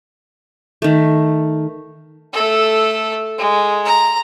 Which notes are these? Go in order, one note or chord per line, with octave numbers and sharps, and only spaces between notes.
D#3 A3
A3 A4
G#3
A#5